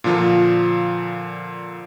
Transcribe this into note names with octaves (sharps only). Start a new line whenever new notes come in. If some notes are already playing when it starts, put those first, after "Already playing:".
A#2 D3 F3 F4